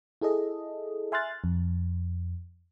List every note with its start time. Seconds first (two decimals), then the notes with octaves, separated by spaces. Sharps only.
0.22 E4 G#4 A4 D#5
1.12 E5 G#5 C6 F6 F#6 A6
1.44 F2